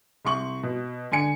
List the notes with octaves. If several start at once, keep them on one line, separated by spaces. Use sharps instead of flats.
C2 C6 C#6 F#7
B2
D3 G#5 C#7